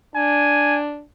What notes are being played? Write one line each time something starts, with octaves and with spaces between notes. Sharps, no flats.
D4 G#5